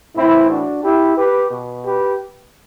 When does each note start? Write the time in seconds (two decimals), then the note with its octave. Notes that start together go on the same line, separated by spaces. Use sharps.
0.15 A2 E3 C4 E4
0.49 D4 F#4
0.83 E4 G4
1.17 G4 B4
1.50 B2
1.85 G4 B4